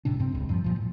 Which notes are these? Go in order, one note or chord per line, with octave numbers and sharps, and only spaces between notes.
D#1 A2 C3 D4
G2 C3 C4
D#1 C#2
G2 F3
A#2 F3
A2